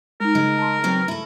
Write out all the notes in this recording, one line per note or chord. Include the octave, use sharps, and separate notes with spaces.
G#3 D#4 A#4
C#3 G#3
A5 C6
F#3 B3 C4
A3 E4